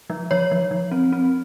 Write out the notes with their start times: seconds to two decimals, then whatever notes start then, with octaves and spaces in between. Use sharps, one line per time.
0.10 F3
0.31 F3 C#5
0.51 F3
0.71 F3
0.91 C4
1.12 C4